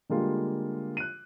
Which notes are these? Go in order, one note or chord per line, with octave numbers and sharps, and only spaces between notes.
D3 G3 G#3 A#3 F4 G4
F#6 D#7